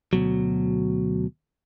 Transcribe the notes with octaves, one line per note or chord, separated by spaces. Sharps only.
D2 B2 F#3